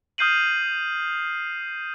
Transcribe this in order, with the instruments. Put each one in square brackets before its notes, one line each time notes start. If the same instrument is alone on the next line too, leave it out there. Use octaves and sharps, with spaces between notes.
[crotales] D#6 F6 G6 C7 D#7 F#7